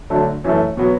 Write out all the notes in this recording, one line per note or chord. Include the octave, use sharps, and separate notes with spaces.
D3 F#3 A3 D4
F#2 E3 A3
B2 F#3 B3